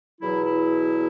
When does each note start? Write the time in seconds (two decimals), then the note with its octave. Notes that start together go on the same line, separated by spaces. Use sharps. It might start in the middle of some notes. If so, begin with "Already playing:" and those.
0.21 E2 B2 F#3 E4
0.45 E4